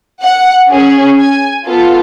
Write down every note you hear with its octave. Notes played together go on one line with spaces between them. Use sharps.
F#5
C#4 G#4
G#5
B3 F4 A4